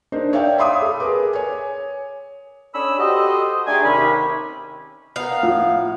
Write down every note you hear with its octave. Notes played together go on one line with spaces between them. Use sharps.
D4 D#4 A#4 C5
C#5 D5 E5 F5 G5
E5 F5 B5 C6 D6 D#6
A4
G#4 A#4 B4 D6
C#5 G#5
C#4 D4 A4 D#5 B5 E6
F#4 G4 A4 C5 D#5
A3 D4 D#4 G4 G#4 G#5
D#2 C3 C#4 B5
B3 A#4 F5
A2 F3